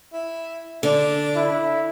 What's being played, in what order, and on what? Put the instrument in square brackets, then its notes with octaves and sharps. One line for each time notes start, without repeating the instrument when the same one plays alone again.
[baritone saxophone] E4
[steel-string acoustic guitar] D3 [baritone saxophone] D4
[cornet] E4